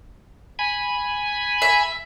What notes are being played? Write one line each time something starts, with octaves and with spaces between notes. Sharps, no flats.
G#5 B5
E5